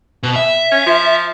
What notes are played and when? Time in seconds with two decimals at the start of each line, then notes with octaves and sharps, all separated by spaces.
0.23 B2
0.36 E5
0.71 C#4
0.86 F3